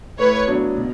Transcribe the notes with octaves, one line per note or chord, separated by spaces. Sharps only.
A2 B4 C#5
F#3 B3 D4
B2